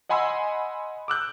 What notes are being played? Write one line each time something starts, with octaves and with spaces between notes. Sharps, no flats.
D#5 F#5 G#5 B5 C6 E6
D6 E6 F#6 G6